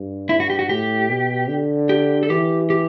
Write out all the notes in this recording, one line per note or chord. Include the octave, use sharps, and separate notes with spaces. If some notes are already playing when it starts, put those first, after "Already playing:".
Already playing: G2
E4
F#4
G4
F#4
A2 G4
B2
D3
G4
A4
E3 G4
G4